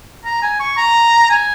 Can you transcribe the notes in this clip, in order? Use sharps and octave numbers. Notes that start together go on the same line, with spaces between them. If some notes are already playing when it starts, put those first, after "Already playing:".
A#5
G#5
C#6
A#5
G#5